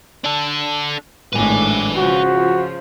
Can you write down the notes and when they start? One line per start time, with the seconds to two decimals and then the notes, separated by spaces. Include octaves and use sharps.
0.24 D4 A4
1.33 G#1 A2 D4 B4 G#5
1.97 C#3 F3 F#4